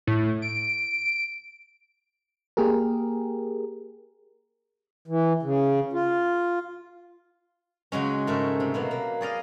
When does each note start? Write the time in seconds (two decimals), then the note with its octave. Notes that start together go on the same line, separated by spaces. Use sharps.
0.07 A2
0.42 D7
2.57 A#3 G4 G#4 A#4
5.07 E3
5.43 C#3
5.93 F4
7.92 C#3 F#3 G#3 C#4
8.27 G#2 A3 A#4 E5 G5
8.60 C3
8.74 B2 F#3 A#3
8.91 A#3
9.21 G#4 D5 D#5 F5